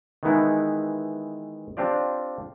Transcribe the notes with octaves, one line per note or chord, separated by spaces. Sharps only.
D#3 E3 G#3 B3 D#4 E4
C4 D4 F4 G4 D5